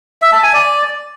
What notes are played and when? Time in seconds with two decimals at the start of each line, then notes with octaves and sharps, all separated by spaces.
0.22 E5
0.32 A5
0.43 G#5
0.53 D5